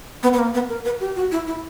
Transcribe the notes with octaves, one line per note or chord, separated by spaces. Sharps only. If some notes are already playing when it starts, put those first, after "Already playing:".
B3
B3
A#3
B3
A#4
B4
G4
F#4
E4
E4